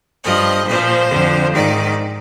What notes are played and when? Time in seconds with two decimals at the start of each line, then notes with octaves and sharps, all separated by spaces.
0.23 G2 F3 D#5
0.66 A#2 F3 C5
1.10 F2 D3 F3
1.54 G#2 D#3 D5